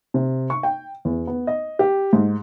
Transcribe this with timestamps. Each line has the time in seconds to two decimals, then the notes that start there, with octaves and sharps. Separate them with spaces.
0.14 C3
0.50 C#6
0.63 G5
1.05 E2
1.27 B3
1.47 D#5
1.79 G4
2.13 G#2